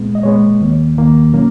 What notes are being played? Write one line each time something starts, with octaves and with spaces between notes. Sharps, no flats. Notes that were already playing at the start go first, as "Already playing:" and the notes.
Already playing: A#2 G#3 B3
D#5
A#2 G#3 B3 C#5
D#2 D#3 A#3
D#2 D#3 A#3
B2 F#3 A#3 C#4